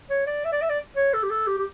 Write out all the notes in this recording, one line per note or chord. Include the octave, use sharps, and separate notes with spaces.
C#5
D5
E5
D5
E5
D5
C#5
A4
G4
A4
G4
G4